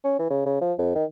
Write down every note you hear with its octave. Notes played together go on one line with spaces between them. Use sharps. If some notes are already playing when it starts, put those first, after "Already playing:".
C#4
E3
C#3
C#3
F3
F2
D#3